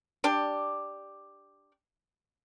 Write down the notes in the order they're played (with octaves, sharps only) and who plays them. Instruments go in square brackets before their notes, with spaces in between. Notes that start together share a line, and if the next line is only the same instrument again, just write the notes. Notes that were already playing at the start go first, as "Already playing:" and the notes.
[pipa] D4 G4